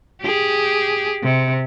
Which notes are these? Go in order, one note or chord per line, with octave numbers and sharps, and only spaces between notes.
G4 G#4
C3